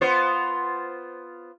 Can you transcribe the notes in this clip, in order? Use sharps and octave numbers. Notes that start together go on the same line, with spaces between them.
B3 F4 C5